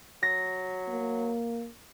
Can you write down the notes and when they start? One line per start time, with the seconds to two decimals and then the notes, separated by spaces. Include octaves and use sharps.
0.23 F#3 A#6
0.89 A#3